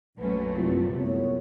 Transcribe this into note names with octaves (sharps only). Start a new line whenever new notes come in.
A#1 F2 A#2 F#3 A3 C#4 B4
C2 F#2 C3 F4
C2 F#2 A2 B3 C#5